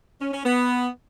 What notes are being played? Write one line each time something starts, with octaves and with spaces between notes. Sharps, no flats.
C#4
C#4
B3